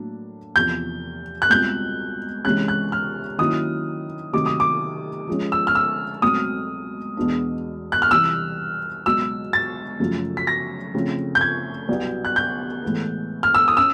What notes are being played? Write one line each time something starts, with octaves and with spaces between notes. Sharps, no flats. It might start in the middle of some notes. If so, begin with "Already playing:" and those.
Already playing: A2 F#3 A#3 D4
E2 C3 F3 G6
F#6
C#2 B2 G3 C4 F4 G6
C#2 C3 E3 G#3 C#4 F#6
F#6
F6
D#3 F#3 A#3 C#4 E4 D#6
C3 D#3 F#3 A3 D6
D#6
D6
F3 G#3 C#4
E6
F6
E6
C#2 B2 F#3 A3 C4 D#6
E2 B2 G#3 B3 D4
F#6
F6
C2 C3 E3 G3 E6
C#2 B2 F#3 E6
A6
F#2 C#3 F3 A3
B6
A#6
C#3 F3 A3 C4
G6
G#6
C2 B2 F#3 B3
F#6
G6
A2 E3 G#3 B3
F6
E6
D#6
C#4 E6